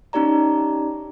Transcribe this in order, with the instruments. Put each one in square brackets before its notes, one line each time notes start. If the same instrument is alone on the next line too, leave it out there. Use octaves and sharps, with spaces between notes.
[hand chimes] C#4 D#4 G4 D5 A#5